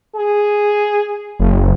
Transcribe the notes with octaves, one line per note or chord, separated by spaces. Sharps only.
G#4
F#1